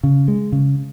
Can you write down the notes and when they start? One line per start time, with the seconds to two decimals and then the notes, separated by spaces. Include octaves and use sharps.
0.03 C#3
0.28 G#3
0.52 C#3